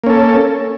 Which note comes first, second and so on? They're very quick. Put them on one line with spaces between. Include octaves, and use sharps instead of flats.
A#3 C#4 A4